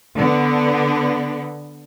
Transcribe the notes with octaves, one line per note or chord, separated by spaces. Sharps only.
D3 B3